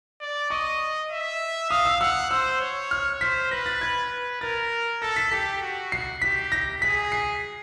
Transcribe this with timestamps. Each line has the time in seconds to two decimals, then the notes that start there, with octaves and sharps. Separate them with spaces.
0.21 D5
0.50 D#5 C#6
1.11 E5
1.70 F5 D#6
1.85 E6
2.01 F#5 E6
2.31 C5 E6
2.61 C#5
2.91 F6
3.21 C5 B6
3.51 B4 A#6
3.66 A6
3.81 G#6
4.12 B4
4.41 A#4 A6
5.02 A4 A#6
5.16 B6
5.31 G4 B6
5.62 F#4
5.92 C7
6.22 G4 B6
6.52 A#6
6.82 G#4 B6
7.12 C7